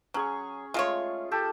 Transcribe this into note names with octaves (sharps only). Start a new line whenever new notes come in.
F#3 C#4 G#4 C#6
G#3 A3 F4 C#5
G4 A4 A5